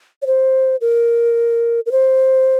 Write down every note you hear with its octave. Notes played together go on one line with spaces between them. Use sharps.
C#5
C5
A#4
A#4
C5